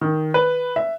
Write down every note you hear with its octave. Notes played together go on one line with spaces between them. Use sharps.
D#3
B4
E5